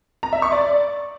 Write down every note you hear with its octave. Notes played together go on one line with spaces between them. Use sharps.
A#5
E5
C#6
D5